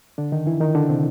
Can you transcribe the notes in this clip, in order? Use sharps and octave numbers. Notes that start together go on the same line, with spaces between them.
D3 D4
D#3 D#4
E3 E4
D#3 D#4
D3 D4
C3 C4